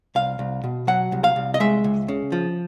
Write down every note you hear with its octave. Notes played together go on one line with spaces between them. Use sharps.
C2 F5
C2
B2
F#3 F#5
C2
F5
C2
D#5
G#3 E5
C#2
C#3
F3